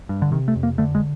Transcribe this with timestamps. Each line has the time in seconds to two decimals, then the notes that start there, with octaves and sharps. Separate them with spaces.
0.09 G2
0.22 D3
0.32 C3 D#3
0.48 A3
0.56 F2
0.63 A#3
0.78 D3 A3
0.95 G#3